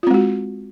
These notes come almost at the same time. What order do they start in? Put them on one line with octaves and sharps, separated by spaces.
F4 C4 G#3 F#4